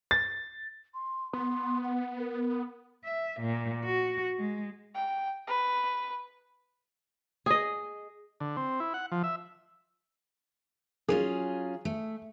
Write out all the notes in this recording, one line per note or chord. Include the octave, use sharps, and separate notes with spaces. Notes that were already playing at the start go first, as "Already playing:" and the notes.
A6
C6
B3 C6
F#5
A#4
E5
A#2
F#4
G#3
G5
B4
G#4 D#5
D3
C4
E4
F#5
F3
E5
F#3 C#4 F4 G#4
A3